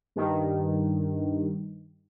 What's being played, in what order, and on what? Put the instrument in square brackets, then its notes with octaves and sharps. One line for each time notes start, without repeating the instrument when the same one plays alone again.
[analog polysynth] G2 D#3